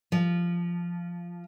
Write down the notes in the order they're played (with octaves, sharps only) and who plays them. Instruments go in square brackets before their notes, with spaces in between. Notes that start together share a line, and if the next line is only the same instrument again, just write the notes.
[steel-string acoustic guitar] F3